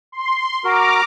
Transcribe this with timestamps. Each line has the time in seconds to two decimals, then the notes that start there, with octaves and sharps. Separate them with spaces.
0.12 C6
0.64 F#4 A#4 A#5 D6 F6